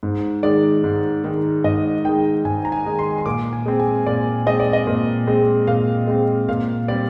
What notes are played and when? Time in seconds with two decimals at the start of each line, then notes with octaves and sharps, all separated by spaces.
0.03 G#2
0.43 D#3 G#3 D5
0.84 G#2
1.24 D#3 G#3
1.64 G#2 D#5
2.05 D#3 G#3 G5
2.45 G#2 G#5
2.65 A#5
2.72 G#5
2.86 D#3 G#3
2.99 C6
3.18 C6
3.26 A#2 D6
3.53 G#5
3.66 G#3 C4
3.80 G#5
4.06 A#2 D5
4.46 G#3 C4 D#5
4.60 D5
4.73 D#5
4.87 A#2
5.27 G#3 C4
5.67 A#2 F5
6.07 G#3 C4
6.49 A#2 F5
6.88 G3 C4 D5